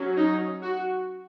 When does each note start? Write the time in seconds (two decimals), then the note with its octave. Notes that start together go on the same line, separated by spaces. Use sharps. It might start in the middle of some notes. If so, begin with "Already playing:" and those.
Already playing: F#3 C#4
0.17 D#4
0.62 F#4